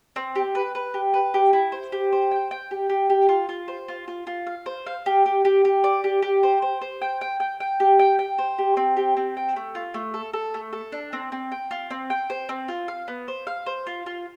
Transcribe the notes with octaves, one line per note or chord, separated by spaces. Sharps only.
C4
G4
B4
B4
G4
B4
G4
E4
C5
G4
C5
G5
G5
G4
G4
G4
F4
F4
C5
F4
F4
F4
F5
C5
F5
G4
G4
G4
G4
D5
G4
G4
C5
C5
C5
G5
G5
G5
G5
G4
G5
G5
C5
G4
C4
G4
C4
G5
A3
F4
A3
A4
A4
A3
A4
D4
C4
C4
G5
F4
C4
G5
C5
C4
F4
F5
B3
C5
F5
C5
F4
F4